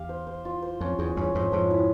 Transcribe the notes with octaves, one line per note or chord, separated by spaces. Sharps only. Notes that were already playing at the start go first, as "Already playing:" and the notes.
Already playing: E2 G4 F5
C5
C5
F4
C5
F2 C#4
E2 G#4
E2 G2 C#4
F2 G#2 C5
F2 G#2 F3
E4